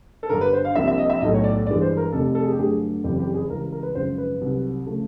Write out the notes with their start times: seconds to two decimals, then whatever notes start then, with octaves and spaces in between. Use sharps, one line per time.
0.23 A4
0.29 G1 G2 D3 A#4
0.41 B4
0.53 C5
0.65 F5
0.75 C2 C3 F3 A#3 D4 E5
0.87 E5
0.98 D#5
1.09 E5
1.21 B1 A2 F#3 A3 D#5
1.34 C#5
1.44 D5
1.67 G1 G2 E3 G#3 D5
1.82 C5
1.97 A#4
2.12 F1 F2 C3 D#3 A4
2.35 A4
2.43 G#4
2.51 G4
2.58 G2 D3 F#3 A3 G#4
3.04 F#1 F2 C#3 E3 G4
3.19 G4
3.34 G#4
3.49 C#2 C#3 E3 G3 A#4
3.72 A#4
3.83 B4
3.95 G#1 F#2 C#3 F3 C5
4.18 B4
4.41 C2 C3 D#3 F#3
4.86 C#3 F3 A3